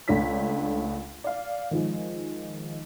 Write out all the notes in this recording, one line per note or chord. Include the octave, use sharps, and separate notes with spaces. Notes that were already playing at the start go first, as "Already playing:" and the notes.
C#2 A3 D4 C#5 B6
D5 F5
D#3 F3 G#3